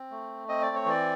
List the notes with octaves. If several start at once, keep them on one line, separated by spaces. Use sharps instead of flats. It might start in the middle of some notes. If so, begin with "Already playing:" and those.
Already playing: C4
A3
C4 D#5
D5
C#5
E3 D5